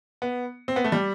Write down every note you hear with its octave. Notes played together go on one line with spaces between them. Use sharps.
B3
C4
B3
A3
G3